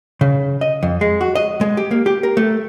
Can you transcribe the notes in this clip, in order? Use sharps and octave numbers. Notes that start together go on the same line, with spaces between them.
C#3
D#5
F2
G#3
F#4
D#5
G#3
G4
A#3
G4
A#4
A3